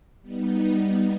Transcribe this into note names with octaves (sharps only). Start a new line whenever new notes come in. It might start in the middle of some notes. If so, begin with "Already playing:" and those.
G3 B3 D#4